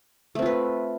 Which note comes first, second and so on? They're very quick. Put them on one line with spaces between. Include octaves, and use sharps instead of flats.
A3 C4 F4 B4